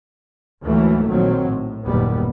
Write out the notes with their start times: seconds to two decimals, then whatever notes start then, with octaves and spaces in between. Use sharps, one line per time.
0.64 D2 G#2 E3 F#3 A3 A#3
1.08 A#1 A#2 D#3 F#3 C4
1.47 A2
1.86 F#1 D#2 A#2 G3 B3